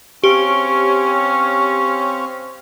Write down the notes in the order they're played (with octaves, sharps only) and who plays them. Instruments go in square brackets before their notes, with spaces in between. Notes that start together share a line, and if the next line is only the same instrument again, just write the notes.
[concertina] C4 C#5 F5 [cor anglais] C#4 [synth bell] G4